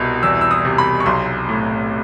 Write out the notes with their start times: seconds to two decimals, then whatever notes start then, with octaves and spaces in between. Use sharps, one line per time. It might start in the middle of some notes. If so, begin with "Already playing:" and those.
Already playing: C2 B2
0.23 E2 E6
0.41 E6
0.51 D#6
0.65 C3
0.78 B5
1.00 C#6
1.06 B1 C6
1.49 A2